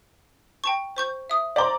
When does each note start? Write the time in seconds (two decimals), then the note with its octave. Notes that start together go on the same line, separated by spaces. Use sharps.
0.64 G5 A5 C#6
0.97 C5 C#6 G6
1.30 E5 D#6
1.56 C5 D5 A#5 C6